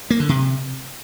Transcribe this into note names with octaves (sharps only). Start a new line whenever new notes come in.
A#3
D3
C3